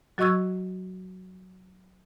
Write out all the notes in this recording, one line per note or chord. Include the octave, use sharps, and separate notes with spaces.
F#3 F#4 D#5 C#6 E6 G#6